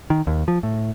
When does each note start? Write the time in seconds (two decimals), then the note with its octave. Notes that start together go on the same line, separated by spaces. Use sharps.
0.10 D#3
0.27 D#2
0.48 F3
0.63 A2